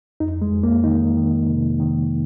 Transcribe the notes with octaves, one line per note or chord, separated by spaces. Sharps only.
F2 D#4
G#3
F2
A#3
D#3 D#4
D#3
C3
D#3